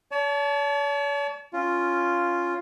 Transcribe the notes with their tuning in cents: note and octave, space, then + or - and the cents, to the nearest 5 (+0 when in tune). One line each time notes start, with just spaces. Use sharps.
C#5 +45 A5 -20
C#4 +0 F4 +0